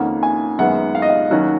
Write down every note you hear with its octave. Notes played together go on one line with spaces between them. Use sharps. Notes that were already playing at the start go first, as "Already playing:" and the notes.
Already playing: F2 D#3 A#3 C#4 F#5
G#5
F#2 D#3 G#3 B3 F#5
F5
D#5
F5
D#2 D#3 F#3 C#4 F#4